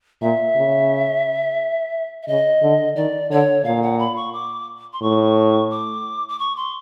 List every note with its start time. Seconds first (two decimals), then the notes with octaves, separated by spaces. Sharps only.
0.21 A#2 E5
0.56 C#3
2.23 E5
2.27 C#3 D#5
2.63 D3
2.96 D#3 D5
3.31 D3 C#5
3.64 A#2 F5
3.82 F#5
3.99 B5
4.16 C#6
4.33 D6
4.93 C6
5.02 A2 C#6
5.71 D6
6.29 D6
6.39 C#6
6.57 C6